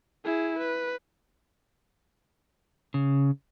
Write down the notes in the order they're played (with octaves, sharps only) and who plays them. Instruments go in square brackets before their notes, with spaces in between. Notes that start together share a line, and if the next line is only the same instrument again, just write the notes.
[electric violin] E4 G#4
B4
[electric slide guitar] C#3